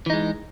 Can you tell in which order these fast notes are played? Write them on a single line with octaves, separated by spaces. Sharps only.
E3 D#4 G#3